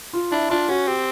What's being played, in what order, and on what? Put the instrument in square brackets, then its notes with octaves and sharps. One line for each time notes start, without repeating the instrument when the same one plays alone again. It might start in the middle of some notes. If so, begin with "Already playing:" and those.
[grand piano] F4
[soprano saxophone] D4 [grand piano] E4
[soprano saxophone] D4 [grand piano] F4
[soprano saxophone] C#4 [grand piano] F#4
[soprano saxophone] C4 [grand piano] G4